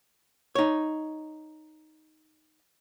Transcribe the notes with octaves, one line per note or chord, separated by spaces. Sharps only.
D#4 C#5